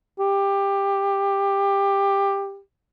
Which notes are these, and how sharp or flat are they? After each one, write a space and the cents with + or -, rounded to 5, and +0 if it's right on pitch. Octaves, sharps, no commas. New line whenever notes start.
G4 +15